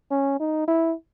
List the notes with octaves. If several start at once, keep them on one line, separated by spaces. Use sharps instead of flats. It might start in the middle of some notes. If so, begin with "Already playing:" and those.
C#4
D#4
E4